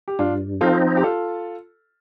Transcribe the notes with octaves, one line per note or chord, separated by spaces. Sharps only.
G4
G2 D4 F4
F3 C4 D#4 F4 A4
G4
F4 A4